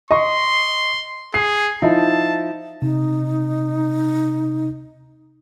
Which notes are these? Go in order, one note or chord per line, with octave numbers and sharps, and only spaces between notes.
D#5 C6 C#6
G#4 C7
F3 D#4 E4 A5
C3 D#4